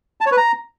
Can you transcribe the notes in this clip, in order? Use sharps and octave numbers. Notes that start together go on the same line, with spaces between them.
A5
C#5
B4
A#5